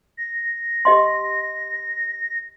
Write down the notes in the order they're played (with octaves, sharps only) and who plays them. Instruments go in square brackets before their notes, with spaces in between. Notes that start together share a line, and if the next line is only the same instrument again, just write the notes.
[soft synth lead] A#6
[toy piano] G4 D#5 C6